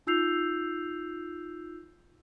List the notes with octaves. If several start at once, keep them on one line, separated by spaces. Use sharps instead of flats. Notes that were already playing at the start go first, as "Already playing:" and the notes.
D#4 F4 E6 G6 C7 F7